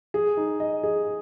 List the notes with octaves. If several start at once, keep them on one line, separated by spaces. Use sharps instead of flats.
G#4
D#4
D#5
G#4